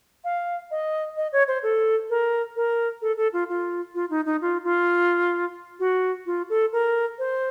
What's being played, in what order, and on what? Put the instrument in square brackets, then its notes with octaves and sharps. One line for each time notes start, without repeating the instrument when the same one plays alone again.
[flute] F5
D#5
D#5
C#5
C5
A4
A#4
A#4
A4
A4
F4
F4
F4
D#4
D#4
F4
F4
F#4
F4
A4
A#4
C5